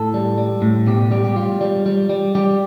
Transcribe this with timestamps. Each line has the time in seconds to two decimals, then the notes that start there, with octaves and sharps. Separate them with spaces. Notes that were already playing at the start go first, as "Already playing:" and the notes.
Already playing: A2 A4
0.14 G3
0.38 G3
0.62 A2
0.86 B2 G4
1.11 G3 G4
1.24 G4
1.36 G3 F4
1.61 G3
1.86 G3
2.09 G3
2.35 G3 G4